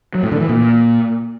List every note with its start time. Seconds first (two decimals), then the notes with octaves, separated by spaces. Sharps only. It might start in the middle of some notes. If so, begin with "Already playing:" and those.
0.15 F#3
0.23 A2
0.32 D3
0.40 E3
0.49 A#2